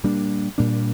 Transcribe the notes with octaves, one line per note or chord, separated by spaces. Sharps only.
A#2 G3 A#3 D4
A#2 G3 A#3 D4